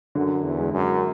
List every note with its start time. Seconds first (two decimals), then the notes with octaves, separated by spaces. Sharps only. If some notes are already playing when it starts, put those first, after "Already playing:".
0.15 F#2 D3
0.44 E2
0.58 G#3
0.73 F#2